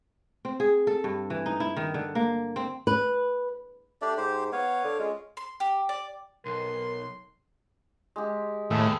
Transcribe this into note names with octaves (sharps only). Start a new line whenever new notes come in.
C4
G#4
A4
G2
E3
D#4
E4
D#3
D3
A#3
C4
B4
A3 D4 G4 D5
G#2 G4 C5
B3 C#5 F5
D3
G#3 C#4 F4
C6
G4
D5
B1 A#4 C6
G#3 G4
D#2 A2 G#4 A4 B4